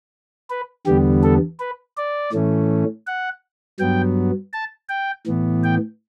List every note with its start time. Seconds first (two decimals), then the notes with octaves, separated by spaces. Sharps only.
0.50 B4
0.86 E2 D3 G3 B3 G4
1.23 A4
1.60 B4
1.97 D5
2.33 A2 E3 A3 C#4
3.07 F#5
3.80 G2 F#3 B3 G5
4.53 A5
4.89 G5
5.26 A2 E3 B3
5.64 G5